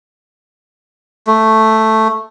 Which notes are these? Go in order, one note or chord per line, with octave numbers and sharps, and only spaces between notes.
A3